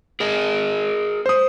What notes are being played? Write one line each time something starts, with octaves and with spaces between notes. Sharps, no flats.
G#4 A#4 D#5
C5 D#6